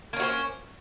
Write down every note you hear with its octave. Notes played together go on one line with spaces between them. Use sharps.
A#3 C#4 F#4 C5